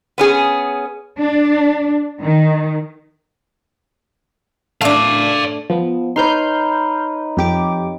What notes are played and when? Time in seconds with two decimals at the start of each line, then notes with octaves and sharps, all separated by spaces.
0.18 B3 C#4 G#4
1.19 D4
2.21 D#3
4.81 A3 D4 D5 F5
5.70 F3 B3
6.16 D#4 B4 C#5 C6 F6 G6
7.37 F2 G4 D6